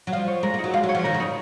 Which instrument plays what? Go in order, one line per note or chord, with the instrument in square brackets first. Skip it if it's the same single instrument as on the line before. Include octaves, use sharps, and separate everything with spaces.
[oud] F#3
[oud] F3 [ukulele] F5
[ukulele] C#5
[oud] G#3 [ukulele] A#4
[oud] A#3
[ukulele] D#4
[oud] F#3
[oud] G#3 [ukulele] F5
[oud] F#3
[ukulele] C#5
[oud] F3
[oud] D#3 [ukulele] A#4
[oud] C#3
[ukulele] D#4